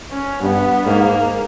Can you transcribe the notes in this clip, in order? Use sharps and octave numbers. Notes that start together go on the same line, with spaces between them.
C#4
G2 B3
G#2 A#3